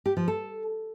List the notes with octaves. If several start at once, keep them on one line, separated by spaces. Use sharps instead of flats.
G4
F3
A4